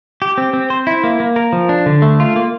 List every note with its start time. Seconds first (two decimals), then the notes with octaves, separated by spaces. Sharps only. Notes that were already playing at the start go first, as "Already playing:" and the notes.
0.22 G4
0.38 C4
0.53 C4
0.70 C5
0.87 E4
1.04 A#3
1.20 A#3
1.36 A#4
1.53 F3
1.69 D4
1.86 D3
2.02 A3
2.20 F4
2.36 A#3